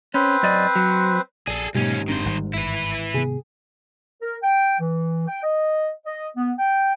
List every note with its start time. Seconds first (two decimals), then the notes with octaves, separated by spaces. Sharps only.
0.14 C4 C#4 B4 C5
0.43 F#2 D5 D#5
0.75 F#3
1.47 A#1 G#4 A4 D5
1.74 D#2 G#2 B2 F#3 A#3 C#4 G4
2.08 F#1 D#3 C4 D4 C5
2.26 G#1 G3
2.54 G1 E4 B4
3.14 C3 B3 G#4
4.22 A#4
4.43 G5
4.79 E3
5.28 G5
5.43 D#5
6.06 D#5
6.37 B3
6.58 G5